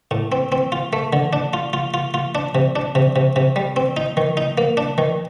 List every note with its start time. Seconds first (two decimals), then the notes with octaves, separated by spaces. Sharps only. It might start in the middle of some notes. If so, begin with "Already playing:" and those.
0.11 A2
0.32 C4
0.52 C4
0.72 F4
0.93 A3
1.13 D3
1.33 D4
1.53 F4
1.73 F4
1.94 F4
2.14 F4
2.35 D4
2.55 C3
2.76 D4
2.95 C3
3.16 C3
3.36 C3
3.56 G3
3.76 C4
3.97 D#4
4.17 D#3
4.37 D#4
4.58 A#3
4.77 D4
4.98 D#3